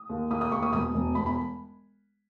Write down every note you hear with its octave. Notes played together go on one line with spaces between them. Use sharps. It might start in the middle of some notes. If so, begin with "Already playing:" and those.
Already playing: D#6
D#2
D#2 D#6
D#6
D#2 C#6
D#6
E1 D#6
E1
E1 B5
B5